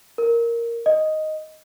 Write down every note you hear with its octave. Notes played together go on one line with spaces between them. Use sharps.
A#4
D#5